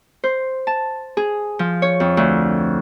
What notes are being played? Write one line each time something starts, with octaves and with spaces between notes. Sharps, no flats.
C5
A5
G#4
F3
C#5
F2
D2